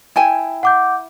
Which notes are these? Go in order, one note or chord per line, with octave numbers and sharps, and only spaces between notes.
E4 G5 G#5
F#5 D6 G6